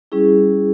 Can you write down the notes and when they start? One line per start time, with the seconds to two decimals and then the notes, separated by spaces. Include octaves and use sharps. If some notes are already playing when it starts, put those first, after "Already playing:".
0.12 G3 C#4 E4 G#4